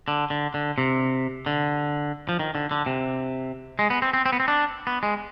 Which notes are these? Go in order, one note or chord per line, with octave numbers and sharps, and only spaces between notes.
D3
D3
D3
C3
D3
F3
D#3
D3
D3
C3
G#3
B3
C4
C4
C4
B3
C4
D4
B3
G#3